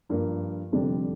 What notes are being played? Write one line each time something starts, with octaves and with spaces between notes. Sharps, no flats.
G2 F3 A#3
F1 F2 D3 G3 D4